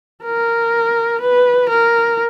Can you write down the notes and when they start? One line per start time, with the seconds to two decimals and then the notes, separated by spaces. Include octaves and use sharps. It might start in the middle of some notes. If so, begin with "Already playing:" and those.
0.24 A#4
1.21 B4
1.69 A#4